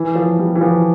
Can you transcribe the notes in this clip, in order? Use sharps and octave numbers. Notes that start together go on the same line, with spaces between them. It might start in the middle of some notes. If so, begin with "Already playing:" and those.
Already playing: E3
F3
G3
E3
F3